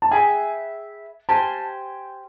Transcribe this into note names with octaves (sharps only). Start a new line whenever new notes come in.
A5
G#4 B4 E5 G5 G#5
G4 C5 F5 G#5 A5